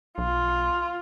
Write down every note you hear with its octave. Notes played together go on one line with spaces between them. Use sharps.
B1 F4